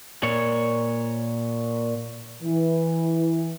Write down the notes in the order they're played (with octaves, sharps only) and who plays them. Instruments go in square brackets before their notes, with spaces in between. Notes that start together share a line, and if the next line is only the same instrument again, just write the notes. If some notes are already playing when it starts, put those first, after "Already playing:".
[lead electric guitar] A#2 C#5
[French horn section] E3